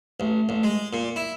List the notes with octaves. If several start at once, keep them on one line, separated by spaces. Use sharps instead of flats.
A1
A1
G#3
A#2
E4